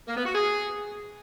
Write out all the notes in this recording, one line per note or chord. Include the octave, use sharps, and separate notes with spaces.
A#3
B3
F#4
G#4